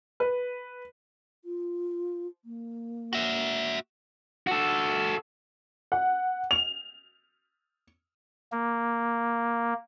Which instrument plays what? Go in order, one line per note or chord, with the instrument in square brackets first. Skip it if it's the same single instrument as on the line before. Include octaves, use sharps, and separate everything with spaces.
[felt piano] B4
[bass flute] F4
A#3
[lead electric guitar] F#4 E5
F#4 A4
[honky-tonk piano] F#5
F7
[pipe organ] A#3